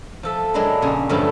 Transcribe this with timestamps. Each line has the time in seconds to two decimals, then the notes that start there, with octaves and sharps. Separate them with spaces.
0.23 F3 A4 E5
0.54 F#3 G#3 A#3 D4 E4
0.82 F2 A#2 C#3 C#4 G#4
1.09 G2 D3 F3 F#3 A3 E4